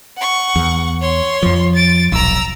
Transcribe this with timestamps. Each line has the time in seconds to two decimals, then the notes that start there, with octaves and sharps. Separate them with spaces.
0.17 F#5 C#6
0.56 E2
1.01 C#5 C6
1.43 F2 F3
1.75 A6 D7
2.12 D#1 B1 A#5 E6